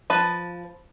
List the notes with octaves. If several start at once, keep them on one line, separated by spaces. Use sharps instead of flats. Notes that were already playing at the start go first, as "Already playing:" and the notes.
F3 B4 A5